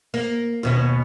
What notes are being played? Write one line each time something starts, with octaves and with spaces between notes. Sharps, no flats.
A#3
D#2 B2 C#4